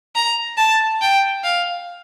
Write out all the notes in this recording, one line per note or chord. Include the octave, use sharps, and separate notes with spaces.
A#5
A5
G5
F5